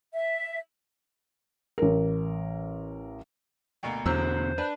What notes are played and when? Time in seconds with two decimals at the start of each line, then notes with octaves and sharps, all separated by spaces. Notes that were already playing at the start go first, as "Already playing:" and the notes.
0.13 E5
1.78 A1 A#4
3.83 D2 B2 A#3
4.06 E2 B2 D3 F#3 A#3 C5 E6
4.58 D4 B4